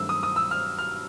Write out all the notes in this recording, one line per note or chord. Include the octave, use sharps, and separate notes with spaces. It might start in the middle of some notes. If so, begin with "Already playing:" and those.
Already playing: G2 D#3 F#3 A3 C4 E6
D#6
D#6
E6
F6
F6